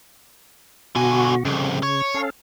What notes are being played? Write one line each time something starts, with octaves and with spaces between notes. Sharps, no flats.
B2 D3 F#4 G#5
C2 F2 C#3
C#5
C#4 A4 F5